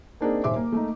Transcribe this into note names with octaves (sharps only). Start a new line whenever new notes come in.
A#3 C4 D4 D#4 G#4 A#4
D#1 C5 E5 D6
A#3
A3 A#3 D#4